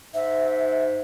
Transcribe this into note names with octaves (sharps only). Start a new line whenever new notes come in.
G#2 E5